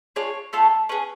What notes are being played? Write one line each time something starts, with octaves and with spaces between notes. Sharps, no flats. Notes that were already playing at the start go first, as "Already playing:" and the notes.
D4 F4 G#4 C#5
A3 F4 A4
C#4 G#4 B4